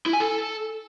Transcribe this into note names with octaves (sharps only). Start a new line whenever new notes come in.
E4
G#5
A4